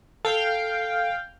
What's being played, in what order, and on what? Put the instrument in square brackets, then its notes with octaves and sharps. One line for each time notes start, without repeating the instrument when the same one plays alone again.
[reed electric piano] A4 [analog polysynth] F5 G5